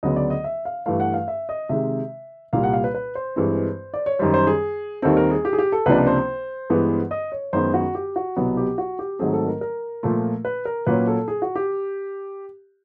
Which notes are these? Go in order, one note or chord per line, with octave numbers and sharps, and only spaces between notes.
D2 C#3 F#3 B3 D#5
D5
D#5
E5
F5
G2 E3 A3 F5
F#5
F5
E5
D#5
C3 D#3 G#3 E5
C2 A#2 G3 A#3 F5
F#5
F5
B4
B4
C5
G2 E3 G#3 C4
D5
C#5
F#2 D#3 G3 C5
C5
G#4
D#2 D#3 G3 C4 A4
A#4
G#4
G4
G#4
G4
A4
C#2 C3 F3 A#3 D4 B4
C5
G2 E3 G#3 B3
D#5
C#5
F#2 D#3 G#3 B3 C5
F#4
G4
F#4
C2 B2 F#3 B3
G4
F#4
G4
G#2 D#3 F#3 A3 C4 G#4
A4
A#4
A#4
A#2 F3 A3
B4
A#4
A#2 F#3 A#3 C#4 B4
A4
G#4
F#4
G4